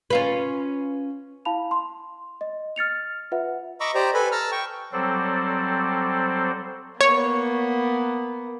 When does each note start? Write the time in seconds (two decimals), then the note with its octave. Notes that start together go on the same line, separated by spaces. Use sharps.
0.10 C#4 F4 B4
1.45 E4 F5 A5 B5 F7
1.71 C6
2.41 D#5
2.76 F6 A6 C#7 F7
3.32 F4 B4 E5 F#5
3.80 D#5 A#5 B5 C#6 D6 E6
3.95 G4 C5 D5 A#5
4.14 A4 B4 G#5 B5
4.32 A5 A#5 E6 F6
4.51 G5 C#6
4.92 F#3 G3 C4 A4 C5 D5
7.01 A#3 B3 C#5